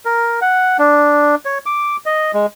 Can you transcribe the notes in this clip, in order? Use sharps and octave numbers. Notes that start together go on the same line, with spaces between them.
A#4
F#5
D4
C#5
D6
D#5
G#3